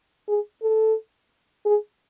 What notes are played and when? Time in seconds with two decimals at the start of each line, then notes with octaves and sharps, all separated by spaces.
0.29 G#4
0.63 A4
1.66 G#4